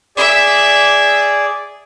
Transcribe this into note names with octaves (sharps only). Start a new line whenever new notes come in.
G#4 D5 E5